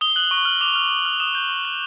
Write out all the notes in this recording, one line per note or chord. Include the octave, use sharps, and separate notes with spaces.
D#6 G7
F#6 F#7
C#6
F6 F#7
D6 F7
F6
D6
F6
D#6 E7
G6
C#6
F#6